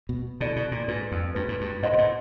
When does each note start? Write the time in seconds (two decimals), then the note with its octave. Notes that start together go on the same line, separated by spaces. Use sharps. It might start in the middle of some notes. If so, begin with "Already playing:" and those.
0.09 B2
0.41 B2 E4 A4 D5
0.56 B2
0.72 A#2
0.88 G#2 D4 F#4 B4
1.12 F2
1.35 G2 D4 F#4 B4
1.48 G#2
1.61 G2
1.83 G#2 C5 D#5 F#5 A5 C6
1.93 A#2
1.98 A2